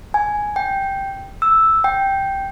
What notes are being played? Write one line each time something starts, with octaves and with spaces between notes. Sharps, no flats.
G#5
G5
E6
G5